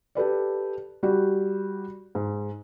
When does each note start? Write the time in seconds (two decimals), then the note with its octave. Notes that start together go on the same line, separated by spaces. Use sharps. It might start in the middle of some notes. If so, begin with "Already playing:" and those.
0.15 G4 A4 B4 D5
1.03 G3 F#4 G4
2.15 G#2